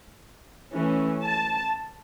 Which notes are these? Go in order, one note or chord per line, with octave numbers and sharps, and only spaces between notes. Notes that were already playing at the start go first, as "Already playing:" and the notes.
E3 A3 C#4
A5